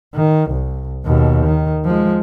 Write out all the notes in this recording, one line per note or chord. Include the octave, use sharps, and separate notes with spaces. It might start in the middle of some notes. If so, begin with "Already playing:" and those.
D#3
C2
D#2 B2
D#3
F3 G#3